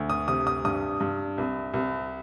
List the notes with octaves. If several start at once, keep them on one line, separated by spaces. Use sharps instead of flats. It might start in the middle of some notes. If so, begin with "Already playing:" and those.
Already playing: D2
D#6
C3 D#6
D#6
G2 D#6
G2
C2
C2